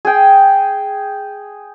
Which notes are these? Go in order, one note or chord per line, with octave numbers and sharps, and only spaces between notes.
G#4 G5